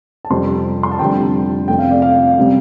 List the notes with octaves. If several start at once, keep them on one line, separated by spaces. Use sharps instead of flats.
A5
F2 C3 G3 C4 C6
C6
A5
F1 F2 D3 G3 G5
F2 C3 A3 G5
F5
D5
F5
C3 G3